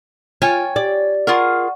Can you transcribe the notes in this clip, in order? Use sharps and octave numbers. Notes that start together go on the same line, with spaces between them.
F4 C#5 G5 G#5
G4 D5 D6
F4 G#4 A#4 F#5 C#6